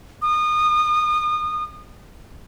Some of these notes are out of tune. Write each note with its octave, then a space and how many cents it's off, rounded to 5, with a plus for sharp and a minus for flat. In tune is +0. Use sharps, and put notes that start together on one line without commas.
D#6 -30